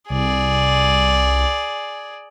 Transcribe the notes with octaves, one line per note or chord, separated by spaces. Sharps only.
C2 G#4 D5